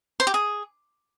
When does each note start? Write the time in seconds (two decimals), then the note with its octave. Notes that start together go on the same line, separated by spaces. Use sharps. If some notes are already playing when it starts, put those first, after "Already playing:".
0.20 C5
0.27 G4
0.34 G#4